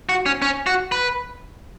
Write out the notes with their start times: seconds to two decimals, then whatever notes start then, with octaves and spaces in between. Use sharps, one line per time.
0.09 F#4
0.26 C#4
0.42 C#4
0.67 F#4
0.92 B4